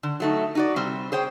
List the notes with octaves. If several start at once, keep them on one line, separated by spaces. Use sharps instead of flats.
D3
F#3 A3 D#4
D#4 F#4 D5
C3 G3 C4
G#4 C5 C#5 G5